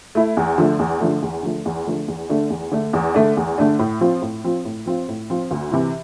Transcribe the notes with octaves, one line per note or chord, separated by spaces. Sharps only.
A3 E4
E2
D3 F3 A3
E2
D3 F3 A3
E2
D3 F3 A3
E2
D3 F3 A3
E2
D3 A3 D4
E2
D3 A3 D4
E2
D3 A3 D4
E2
D3 A3 D4
A2
F3 C4 F4
A2
F3 C4 F4
A2
F3 C4 F4
A2
F3 C4 F4
D2
C3 E3